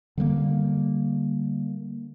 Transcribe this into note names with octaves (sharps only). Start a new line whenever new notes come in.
D3 G3 A3 A#3